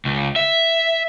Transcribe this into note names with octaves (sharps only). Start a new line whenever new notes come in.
C#2
E5